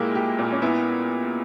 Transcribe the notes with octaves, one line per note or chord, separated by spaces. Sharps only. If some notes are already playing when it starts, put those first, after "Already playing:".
Already playing: A#2 G#3 A#3 E4 G4
G4
A#2
C#4
B3 E4